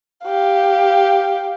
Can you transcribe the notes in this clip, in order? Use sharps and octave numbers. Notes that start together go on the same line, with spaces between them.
G4 F5